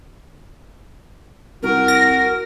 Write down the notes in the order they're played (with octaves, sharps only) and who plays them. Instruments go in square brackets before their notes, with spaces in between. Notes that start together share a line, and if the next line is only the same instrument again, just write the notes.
[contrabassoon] C2 [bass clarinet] F#4 [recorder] A#4
[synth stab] A#6